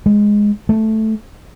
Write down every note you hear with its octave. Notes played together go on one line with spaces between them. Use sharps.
G#3
A3